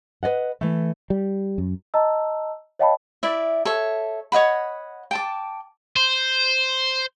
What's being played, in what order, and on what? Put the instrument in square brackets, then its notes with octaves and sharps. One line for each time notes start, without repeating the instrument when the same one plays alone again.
[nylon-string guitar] B4 D5 D#5 F#5
E3 A3
[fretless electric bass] G3
F#2
[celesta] D#5 A5 A#5 E6
C#5 D#5 F5 G5 A5 B5
[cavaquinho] E4 D5 E5
A4 C#5 E5
C#5 D#5 F#5 B5
G5 A5 D6
[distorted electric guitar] C5